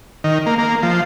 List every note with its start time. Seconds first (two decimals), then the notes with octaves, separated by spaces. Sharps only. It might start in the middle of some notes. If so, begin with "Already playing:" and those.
0.24 D#3
0.46 A#3
0.58 A#3
0.83 F3